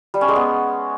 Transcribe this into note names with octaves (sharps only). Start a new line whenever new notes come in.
G3
C#4
G#3
B3